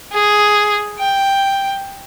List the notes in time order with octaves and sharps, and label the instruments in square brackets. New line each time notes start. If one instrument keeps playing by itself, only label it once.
[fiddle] G#4
G5